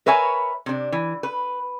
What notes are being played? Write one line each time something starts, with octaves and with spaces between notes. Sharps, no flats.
A#4 B4 C#5 E5 G#5
C3 D4
E3
B4